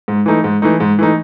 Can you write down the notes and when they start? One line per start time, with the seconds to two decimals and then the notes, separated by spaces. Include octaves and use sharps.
0.08 G#2
0.26 E3 A3 D#4
0.44 G#2
0.62 E3 A3 D#4
0.80 G#2
0.99 E3 A3 D#4